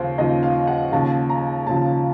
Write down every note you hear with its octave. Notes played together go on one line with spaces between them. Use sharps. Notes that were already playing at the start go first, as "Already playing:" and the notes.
Already playing: D#2 C#3 F3 C5
D#2 C#3 F3 D#5
F5
F#5
D#2 C#3 F3 A5
A#5
D#2 C#3 F3 A5